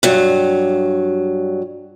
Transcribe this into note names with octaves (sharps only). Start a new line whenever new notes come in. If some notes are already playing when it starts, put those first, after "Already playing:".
G2 F#3